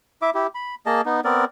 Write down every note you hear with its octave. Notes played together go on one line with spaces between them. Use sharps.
E4 E5 D6
E4 G4
B5
A#3 G#4 D#5 A5
B3 D#4
B3 C4 A#4 D5